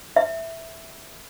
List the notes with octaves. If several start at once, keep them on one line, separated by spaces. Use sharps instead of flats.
E5